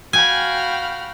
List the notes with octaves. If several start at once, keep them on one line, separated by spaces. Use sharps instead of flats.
F#4 F5 G5 G#5 B5 F6